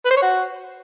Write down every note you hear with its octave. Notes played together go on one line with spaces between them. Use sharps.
B4
C5
C#5
F#4